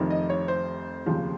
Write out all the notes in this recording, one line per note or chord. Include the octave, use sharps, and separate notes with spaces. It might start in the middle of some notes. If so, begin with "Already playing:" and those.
Already playing: F1 F2 C3 D#3
D#5
C#5
C5
F1 D#2 C#3 F3